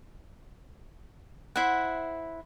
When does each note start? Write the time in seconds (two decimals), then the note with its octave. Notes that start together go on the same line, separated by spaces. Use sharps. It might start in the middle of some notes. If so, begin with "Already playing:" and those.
1.56 E4 C5 E5 F#5